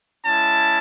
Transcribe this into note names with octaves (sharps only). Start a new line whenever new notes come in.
G#3 C#4 E4 A5